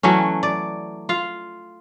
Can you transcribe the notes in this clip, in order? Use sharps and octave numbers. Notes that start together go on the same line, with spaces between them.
E3 F#3 A3 C#4
D5
F4 F5